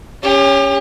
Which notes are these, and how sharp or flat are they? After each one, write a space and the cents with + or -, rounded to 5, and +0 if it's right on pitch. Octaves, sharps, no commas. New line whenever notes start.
C#4 +0 G4 +35